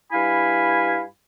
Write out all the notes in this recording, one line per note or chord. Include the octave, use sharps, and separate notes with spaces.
G2 E4 F5 G#5 B5